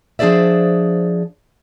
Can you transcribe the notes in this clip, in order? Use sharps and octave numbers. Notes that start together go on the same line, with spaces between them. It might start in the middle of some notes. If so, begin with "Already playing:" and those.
F3 D4 G#4 C5 D5 E5